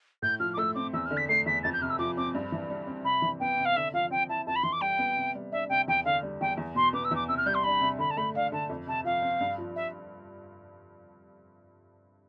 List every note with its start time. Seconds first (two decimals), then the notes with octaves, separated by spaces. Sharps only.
0.22 A2 G6
0.40 F3 F6
0.53 D6
0.57 A3 E6
0.75 C4 D6
0.94 E2 E6
1.05 F6
1.11 D3
1.17 B6
1.29 A3 C7
1.46 E2 B6
1.63 F2 A6
1.73 G6
1.81 C3 F6
1.90 E6
1.99 F3 D6
2.17 C4 D6
2.35 G2
2.52 E3
2.70 G3
2.87 C4
3.04 C3 B5
3.22 E3
3.40 B3 G5
3.58 C3
3.65 F5
3.76 D3 E5
3.93 F3 F5
4.10 C4 G5
4.29 E4 A5
4.46 F2 A5
4.56 B5
4.63 E3 C6
4.73 D6
4.81 G3 G5
4.99 B3
5.16 C3
5.35 G3
5.52 D4 E5
5.69 C3 G5
5.88 E2 G5
6.05 D3 F5
6.23 G3
6.41 E2 G5
6.57 E2
6.75 B2 C6
6.93 B3 D6
7.05 E6
7.11 E2 D6
7.28 C3 E6
7.37 F6
7.46 G3 G6
7.54 C6
7.64 D4 B5
7.81 C3
7.99 D3 B5
8.11 A5
8.17 A3 B5
8.35 D4 F5
8.52 D3 A5
8.69 F2
8.87 C3 A5
9.04 F3 F5
9.22 C4
9.41 G2
9.58 F3
9.76 E5